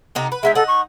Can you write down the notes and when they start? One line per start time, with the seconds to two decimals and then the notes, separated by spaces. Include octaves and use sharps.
0.15 C3 D#4 A4
0.32 B4
0.43 G#3 A#3 D#4 E5
0.55 D#4 A4 F#5
0.68 C#6